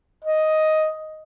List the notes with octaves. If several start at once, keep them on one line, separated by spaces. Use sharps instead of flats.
D#5